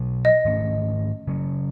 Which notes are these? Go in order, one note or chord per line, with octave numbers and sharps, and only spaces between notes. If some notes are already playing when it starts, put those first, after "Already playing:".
Already playing: B2 F#3 B3
D#5
G#2 D#3 A3 C#4
C#3 F#3 C#4